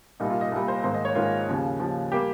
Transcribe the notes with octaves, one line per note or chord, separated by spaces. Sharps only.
C2 A#2 G3 D#4
F4
D#5
C2 A#2 G3
C5
G#2 D#3 A#3 C5
D#5
C#5
G#2 D#3 A#3 F4
D#2 C#3 F3
D#2 C#3 F3
G3 A#3 G4